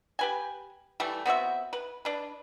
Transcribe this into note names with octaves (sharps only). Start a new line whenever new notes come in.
G4 B4 G#5
E3 G3 A3
B3 C4 F#4 E5
B4
D4 B4